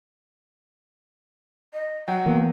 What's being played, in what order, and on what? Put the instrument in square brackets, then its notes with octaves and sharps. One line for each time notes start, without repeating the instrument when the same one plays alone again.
[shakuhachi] D#5
[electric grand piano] F#3 G5 [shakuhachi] F#5
[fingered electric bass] E3 B3 [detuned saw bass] A#3